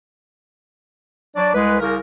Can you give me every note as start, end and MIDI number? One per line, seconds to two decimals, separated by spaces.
1.36 1.53 54
1.36 1.53 62
1.36 1.53 74
1.54 1.78 36
1.54 1.78 56
1.54 1.78 71
1.80 1.98 36
1.80 1.98 49
1.80 1.98 70